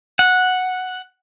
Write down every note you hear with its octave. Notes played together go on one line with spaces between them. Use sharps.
F#5